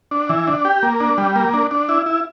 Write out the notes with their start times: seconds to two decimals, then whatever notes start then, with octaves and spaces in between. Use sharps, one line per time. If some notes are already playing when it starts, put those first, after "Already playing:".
0.11 D4
0.29 E3
0.47 D4
0.65 G4
0.83 A#3
1.00 D4
1.18 G3
1.36 A#3
1.54 D4
1.71 D4
1.89 E4
2.06 E4